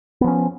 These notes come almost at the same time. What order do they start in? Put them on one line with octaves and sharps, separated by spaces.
B3 F3 C#4